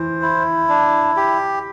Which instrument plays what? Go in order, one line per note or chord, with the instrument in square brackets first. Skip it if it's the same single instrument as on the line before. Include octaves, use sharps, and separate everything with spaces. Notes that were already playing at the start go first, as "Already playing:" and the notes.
Already playing: [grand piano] E3 [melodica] C5
[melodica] E4
D4
G4